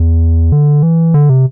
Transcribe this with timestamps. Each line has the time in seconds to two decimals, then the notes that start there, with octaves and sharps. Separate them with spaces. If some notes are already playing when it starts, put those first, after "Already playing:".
Already playing: E2
0.52 D3
0.83 E3
1.14 D3
1.30 C3